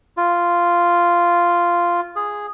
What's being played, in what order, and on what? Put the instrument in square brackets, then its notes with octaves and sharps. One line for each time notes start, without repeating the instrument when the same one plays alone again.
[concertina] F4
G#4